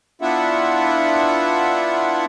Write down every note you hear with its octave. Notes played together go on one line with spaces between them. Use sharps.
B3 D4 E4 F4 E5 F#5